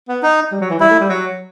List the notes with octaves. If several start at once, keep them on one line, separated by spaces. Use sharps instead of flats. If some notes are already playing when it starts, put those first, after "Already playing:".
B3
D#4
G3
F#3
E3
G3 E4
A3
G3
F#3